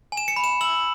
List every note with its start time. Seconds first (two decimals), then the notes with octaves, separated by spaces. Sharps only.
0.12 G#5
0.17 E7
0.28 C#7
0.36 B5
0.44 E7
0.61 E6 F#7